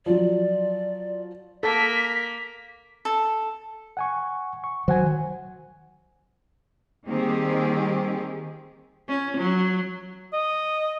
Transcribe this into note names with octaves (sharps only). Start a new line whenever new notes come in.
F3 F#3 D5
A#3 A4 B6
A4
F#5 G#5 C#6
C#6
D#3 F#3 C5 F#5 G#5
D#3 G3 A#3 C4 G4 G#4
C#4
F#3
D#5